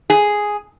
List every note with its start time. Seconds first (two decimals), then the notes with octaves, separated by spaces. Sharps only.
0.10 G#4